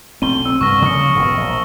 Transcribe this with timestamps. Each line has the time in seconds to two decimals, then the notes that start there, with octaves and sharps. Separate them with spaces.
0.22 B1 A3 C4 D#7 G7
0.46 C4 E6
0.61 C2 G2 C#6 F6 A#6
0.82 C#3 F3 A#3 D#6 F6 C#7
1.15 E1 B1 G2
1.37 A#1